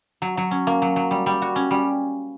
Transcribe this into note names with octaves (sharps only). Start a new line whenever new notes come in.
F#3
F#3
C#4
A#3
F#3
F#3
G3
G3
F#4
C#4
G3